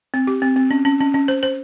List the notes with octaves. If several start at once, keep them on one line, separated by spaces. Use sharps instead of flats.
C4
G4
C4
C4
C#4
C#4
C#4
C#4
C5
C5